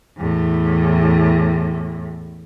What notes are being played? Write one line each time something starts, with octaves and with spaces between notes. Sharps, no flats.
E2 A2